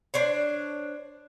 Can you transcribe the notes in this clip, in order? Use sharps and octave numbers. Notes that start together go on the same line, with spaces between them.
D4 C5 C#5